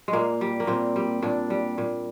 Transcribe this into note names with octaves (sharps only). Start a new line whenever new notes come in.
G#3
A#2 A#3
G3
A#3
A#2 C4
G3
A#2 D4
G3
A#2